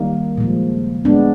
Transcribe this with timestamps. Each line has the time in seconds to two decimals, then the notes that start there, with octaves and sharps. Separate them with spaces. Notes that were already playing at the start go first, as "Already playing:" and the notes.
Already playing: D#3 G3 A#3 D#4
0.37 A#2 F3 G#3
1.05 G#3 B3 D4